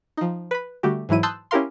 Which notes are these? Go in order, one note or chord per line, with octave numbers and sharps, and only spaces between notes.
F3 D#4
B4 B5
D3 G3 A3 F#4 G4
G#2 E3 F#3 E4 D#7
A5 C6 D#6 E6 F#6 G6
C#4 E4 G4 A#4 F5 C6